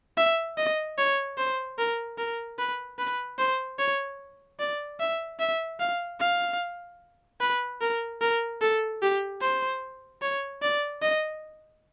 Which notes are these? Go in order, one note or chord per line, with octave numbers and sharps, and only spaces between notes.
E5
D#5
C#5
C5
A#4
A#4
B4
B4
C5
C#5
D5
E5
E5
F5
F5
B4
A#4
A#4
A4
G4
C5
C#5
D5
D#5